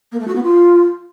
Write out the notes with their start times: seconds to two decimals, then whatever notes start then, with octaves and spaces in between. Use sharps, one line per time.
0.12 A#3
0.20 A3
0.28 F#4
0.35 B3
0.43 F4